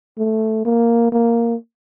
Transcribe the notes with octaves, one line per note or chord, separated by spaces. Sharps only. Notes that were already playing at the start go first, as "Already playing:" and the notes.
A3
A#3
A#3